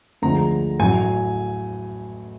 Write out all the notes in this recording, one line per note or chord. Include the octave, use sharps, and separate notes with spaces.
D2 D3 F3 G#3 A#5
A1 A2 F#3 G#5